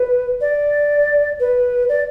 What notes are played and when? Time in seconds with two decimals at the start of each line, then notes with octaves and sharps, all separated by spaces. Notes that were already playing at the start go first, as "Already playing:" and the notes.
Already playing: B4
0.41 D5
1.40 B4
1.89 D5